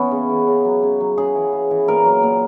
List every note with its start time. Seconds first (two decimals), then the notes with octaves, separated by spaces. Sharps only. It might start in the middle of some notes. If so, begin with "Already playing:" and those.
Already playing: E3 B3 C#4
0.11 C#3
0.29 E3
0.47 C#3
0.65 F#3
0.83 C#3
1.00 F#3
1.18 C#3 G#4
1.35 E3
1.52 C#3
1.71 E3
1.88 A#2 A#4
2.05 F#3
2.23 A#2